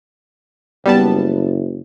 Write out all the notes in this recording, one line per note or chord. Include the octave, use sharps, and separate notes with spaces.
F#1 G3 B3 A5